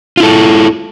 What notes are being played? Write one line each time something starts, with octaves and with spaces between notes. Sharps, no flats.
E4 F4 A4